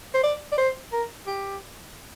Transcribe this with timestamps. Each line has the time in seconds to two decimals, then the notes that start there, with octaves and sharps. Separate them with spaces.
0.14 C5
0.23 D5
0.52 D5
0.58 C5
0.93 A#4
1.27 G4